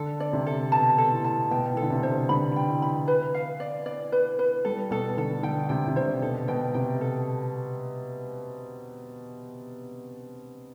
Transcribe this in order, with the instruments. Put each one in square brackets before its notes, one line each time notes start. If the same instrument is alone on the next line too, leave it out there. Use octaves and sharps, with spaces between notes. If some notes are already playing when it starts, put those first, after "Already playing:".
Already playing: [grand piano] D3 [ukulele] A4
[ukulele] D5
[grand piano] C3
[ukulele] A4
[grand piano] B2 [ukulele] A5
[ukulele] A4
[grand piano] A2
[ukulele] A5
[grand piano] B2 [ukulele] G5
[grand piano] E3
[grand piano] D3 [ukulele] A4
[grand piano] C3
[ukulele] C5
[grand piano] D3 [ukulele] B5
[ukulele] G5
[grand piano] E3
[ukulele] B5
B4
F5
D5
D5
B4
B4
[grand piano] G3 [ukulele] A4
[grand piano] B2 [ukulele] A4
[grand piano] D3 [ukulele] A4
[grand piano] D3 [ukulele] G5
[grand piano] C3 [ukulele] G5
[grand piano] C3
[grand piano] D3 [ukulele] C5
[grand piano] B2 [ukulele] A4
[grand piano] B2 [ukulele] G5
[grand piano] C3 [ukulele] G5
[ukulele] A4